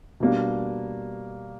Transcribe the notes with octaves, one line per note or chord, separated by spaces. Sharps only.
B2 G3 A#3 D4